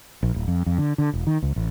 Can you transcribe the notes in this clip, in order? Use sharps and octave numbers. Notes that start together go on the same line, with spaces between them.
A#1
D1
F2
F2
D3
D3
E1
D#3
C#2
A1